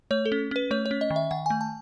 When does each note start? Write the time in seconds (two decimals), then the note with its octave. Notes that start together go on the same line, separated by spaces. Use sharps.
0.11 A3 C#5
0.25 A4
0.32 C#4
0.51 C#4 B4
0.71 A3 C#5
0.86 C#5
0.91 C#4
1.01 D#5
1.10 D#3
1.16 E5
1.31 D#3 F#5
1.46 A3 G#5
1.61 A5